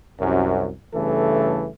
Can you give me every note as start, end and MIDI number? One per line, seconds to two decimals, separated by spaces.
0.19 0.69 36
0.19 0.69 42
0.93 1.68 43
0.93 1.68 49
0.93 1.68 52
0.93 1.68 57
0.93 1.68 69